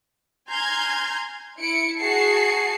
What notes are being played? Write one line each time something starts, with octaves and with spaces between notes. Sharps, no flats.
G#5 A#5 C6 F6 G6 G#6
E4 C#7 D7
F#4 G#4 A5 C7 C#7